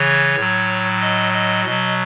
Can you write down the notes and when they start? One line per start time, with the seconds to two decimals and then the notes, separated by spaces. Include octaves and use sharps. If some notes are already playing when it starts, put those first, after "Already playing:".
Already playing: C#3 E3 C#5
0.36 A2 F#3
1.01 D#5
1.33 D#5
1.65 B2 F#3 D#5